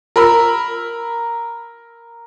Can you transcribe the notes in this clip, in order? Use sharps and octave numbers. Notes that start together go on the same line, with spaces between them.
A#4 B5 E6